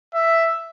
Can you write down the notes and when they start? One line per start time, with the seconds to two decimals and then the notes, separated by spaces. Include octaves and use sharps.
0.14 E5